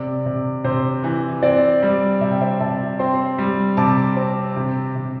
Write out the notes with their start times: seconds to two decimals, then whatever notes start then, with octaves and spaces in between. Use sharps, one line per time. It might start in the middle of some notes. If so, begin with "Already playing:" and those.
Already playing: C3 D5
0.26 C3
0.64 C3 C5
1.04 E3
1.43 C4 D5
1.83 G3
2.21 C3 E5
2.31 G5
2.41 C5 E5
2.60 C3 E5 A5
2.99 C4 G5 C6
3.38 G3
3.77 C3 A5 D6
4.17 C4
4.56 C3
4.95 C3